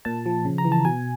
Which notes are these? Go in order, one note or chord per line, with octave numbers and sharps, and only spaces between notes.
A#2 A5
F3
C#3
A#5
E3
A5
B2 G#5